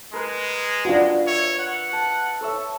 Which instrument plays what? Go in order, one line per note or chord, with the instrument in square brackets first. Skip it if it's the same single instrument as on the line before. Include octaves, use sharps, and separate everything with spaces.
[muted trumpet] G#3 [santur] A#4 B4
[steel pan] D4 F4 F#4
[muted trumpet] C#5 [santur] E5 C#6
[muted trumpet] F#5
[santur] A5
A4 C#5 E5